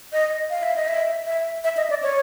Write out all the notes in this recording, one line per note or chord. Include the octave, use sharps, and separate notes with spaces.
D#5
F5
E5
D#5
E5
E5
E5
D#5
D5
C#5